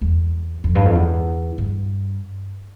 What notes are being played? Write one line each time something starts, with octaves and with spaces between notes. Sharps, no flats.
E2
F2
G2
F2
E2
G2